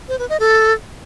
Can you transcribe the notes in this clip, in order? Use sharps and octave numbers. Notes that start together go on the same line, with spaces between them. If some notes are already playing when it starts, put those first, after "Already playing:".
C5
B4
D#5
A4